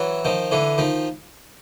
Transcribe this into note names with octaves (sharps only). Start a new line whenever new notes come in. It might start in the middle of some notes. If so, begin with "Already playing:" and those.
Already playing: E3 F#3
D#3 F3
D3 E3
D#3 F3